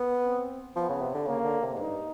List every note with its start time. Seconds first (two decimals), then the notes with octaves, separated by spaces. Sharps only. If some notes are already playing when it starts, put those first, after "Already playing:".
Already playing: B3
0.25 C4
0.76 F3 B3
0.89 C#3
1.01 C3
1.14 D3
1.27 C#3 A#3
1.45 D3
1.62 C3
1.75 G#2
1.78 G2 D#4